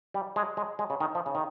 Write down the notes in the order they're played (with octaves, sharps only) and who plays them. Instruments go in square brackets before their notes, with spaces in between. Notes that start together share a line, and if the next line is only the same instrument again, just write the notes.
[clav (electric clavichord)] G3
G#3
G#3
G#3
C#3
D#3
F3
C#3
D#3